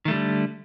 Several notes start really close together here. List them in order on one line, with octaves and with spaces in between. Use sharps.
D#3 A3 G3 D3